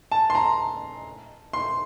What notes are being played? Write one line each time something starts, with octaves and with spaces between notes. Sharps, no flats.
A5
C6
A#5
C6